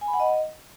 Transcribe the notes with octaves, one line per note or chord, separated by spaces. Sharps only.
G#5
B5
F#5
D#5